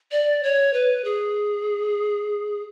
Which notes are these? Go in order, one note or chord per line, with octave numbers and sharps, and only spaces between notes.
D5
C#5
B4
G#4